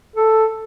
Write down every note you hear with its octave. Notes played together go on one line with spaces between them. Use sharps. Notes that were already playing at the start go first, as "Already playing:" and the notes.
A4